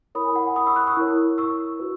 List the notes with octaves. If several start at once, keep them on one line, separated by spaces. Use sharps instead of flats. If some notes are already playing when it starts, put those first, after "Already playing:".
E4 A#4 C#5 B5 D#6
G#5
F#5
G#5
B5 D#6
C#6 E6
D#6 F#6
C#6 E6
E4 A#4 C#5
C#6 E6
F#4 B4